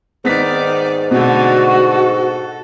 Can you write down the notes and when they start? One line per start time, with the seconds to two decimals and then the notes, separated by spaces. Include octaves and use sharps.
0.25 G#2 D#3 B3 D5 B6
1.11 B2 D3 A3 F#4
1.89 A4